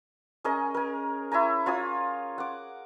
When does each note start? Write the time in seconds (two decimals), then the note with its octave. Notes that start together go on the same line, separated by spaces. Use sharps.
0.44 C#4 G#4 A#4 D#5
0.74 A#4 G#5
1.32 E4 C#5 G#5 A#5
1.66 F4 C#5 G#5 D#6
2.38 F#5 D6